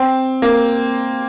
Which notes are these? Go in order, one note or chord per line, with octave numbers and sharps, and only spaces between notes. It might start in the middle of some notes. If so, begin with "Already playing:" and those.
Already playing: C4
A#3